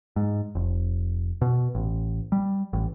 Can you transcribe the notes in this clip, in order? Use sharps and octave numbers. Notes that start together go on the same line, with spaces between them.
G#2
F1
B2
A1
G3
A1